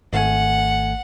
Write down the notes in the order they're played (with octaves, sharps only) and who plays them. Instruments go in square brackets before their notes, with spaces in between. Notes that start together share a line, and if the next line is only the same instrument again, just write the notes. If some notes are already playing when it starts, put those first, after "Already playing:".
[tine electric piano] G#1 A3 G#5 [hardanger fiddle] F#5